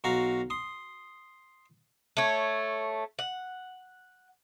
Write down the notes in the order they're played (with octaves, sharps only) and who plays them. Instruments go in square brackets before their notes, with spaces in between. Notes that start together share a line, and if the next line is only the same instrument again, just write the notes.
[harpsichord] B1 F#4 F5 A#5
C6 D#6
[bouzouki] A3 C#5
F#5